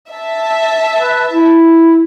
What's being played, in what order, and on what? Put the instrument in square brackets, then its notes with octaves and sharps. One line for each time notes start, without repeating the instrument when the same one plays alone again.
[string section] E5 A5
[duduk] B4
E4